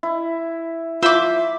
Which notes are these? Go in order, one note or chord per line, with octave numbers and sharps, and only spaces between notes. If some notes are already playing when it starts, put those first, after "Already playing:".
E4
F4 C5 E5 B5 D6 E6